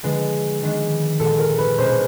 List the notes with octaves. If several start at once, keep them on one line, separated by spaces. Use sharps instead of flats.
D3 F3 G#3 B4
D#3 G#3 B3 D4
A#2 F3 G#3 A4
A#4
B4
B2 G#3 C#4 F4 C5
B4